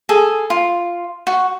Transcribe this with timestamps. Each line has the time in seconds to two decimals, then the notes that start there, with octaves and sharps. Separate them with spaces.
0.09 G#4 A4
0.50 F4
1.27 F#4